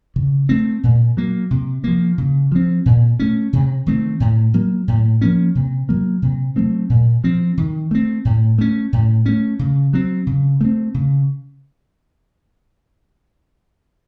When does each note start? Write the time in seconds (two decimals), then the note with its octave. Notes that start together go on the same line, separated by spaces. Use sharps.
0.16 C#3
0.49 A3 C4
0.83 A#2
1.17 F#3 A#3
1.51 C3
1.84 F3 A#3
2.18 C#3
2.52 F3 C4
2.86 A#2
3.19 A3 C#4
3.53 C3
3.86 D#3 A3 C4
4.20 A2
4.54 F#3 A#3
4.88 A2
5.21 F3 A#3 C#4
5.55 C3
5.89 F#3 A#3
6.22 C3
6.56 F#3 A3 C4
6.90 A#2
7.24 F3 C4
7.57 D#3
7.91 A3 C4
8.25 A2
8.58 A3 C#4
8.93 A2
9.26 A3 C#4
9.59 C#3
9.93 F#3 C4
10.27 C#3
10.61 A3 C4
10.94 C#3